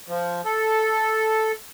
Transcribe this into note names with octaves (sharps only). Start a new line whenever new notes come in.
F3
A4